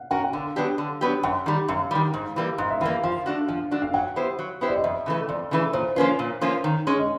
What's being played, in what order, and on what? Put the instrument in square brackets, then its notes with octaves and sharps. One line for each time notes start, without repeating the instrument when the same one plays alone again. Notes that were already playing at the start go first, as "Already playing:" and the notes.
Already playing: [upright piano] F5 F#5
[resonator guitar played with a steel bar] C#4 F#4 A#4 [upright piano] F#5
[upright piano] F#5
[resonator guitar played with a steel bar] D3 [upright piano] F5
[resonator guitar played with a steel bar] F#3 B3 D4 G4
D3
F#3 B3 D4 G4
[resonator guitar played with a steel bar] F#2 [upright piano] F#5
[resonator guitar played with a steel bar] D#3 G3
[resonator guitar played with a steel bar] F#2 [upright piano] F5
[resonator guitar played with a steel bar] D#3 G3
G#2
E3 G3 A#3
[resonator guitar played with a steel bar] G#2 [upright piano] F5
[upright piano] E5
[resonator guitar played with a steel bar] E3 G3 A#3 [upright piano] F5
[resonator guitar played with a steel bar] F3 [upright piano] F5
[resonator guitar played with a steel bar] A3 D4 F#4
[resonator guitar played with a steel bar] F3 [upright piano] F5
[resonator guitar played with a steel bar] A3 D4 F#4
[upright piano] F5
[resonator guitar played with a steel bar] F#3 [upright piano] F#5
[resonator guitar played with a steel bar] B3 E4 G4 C5
F#3
B3 E4 G4 C5
[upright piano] D5
D#5
[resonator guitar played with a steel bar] F2 [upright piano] E5
[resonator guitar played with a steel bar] C#3 E3 A3
[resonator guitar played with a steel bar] F2 [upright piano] D5
[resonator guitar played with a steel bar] C#3 E3 A3
[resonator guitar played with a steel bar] A#2 [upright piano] C5
[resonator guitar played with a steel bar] F3 A#3 C#4 F4 [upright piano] B4
[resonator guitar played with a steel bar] A#2
F3 A#3 C#4 F4
D#3
G#3 C#4
[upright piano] D#5